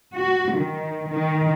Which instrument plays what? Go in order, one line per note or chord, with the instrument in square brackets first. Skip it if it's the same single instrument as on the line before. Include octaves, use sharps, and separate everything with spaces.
[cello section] F#4
D#3
D#3